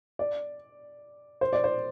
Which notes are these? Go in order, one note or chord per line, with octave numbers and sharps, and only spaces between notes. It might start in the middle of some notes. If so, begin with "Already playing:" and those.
D5
C5
D5
C5